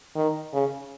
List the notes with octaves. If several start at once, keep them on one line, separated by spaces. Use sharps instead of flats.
D#3
C#3